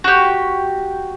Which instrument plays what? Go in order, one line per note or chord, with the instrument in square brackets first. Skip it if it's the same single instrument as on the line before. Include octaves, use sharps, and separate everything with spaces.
[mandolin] F#4 G4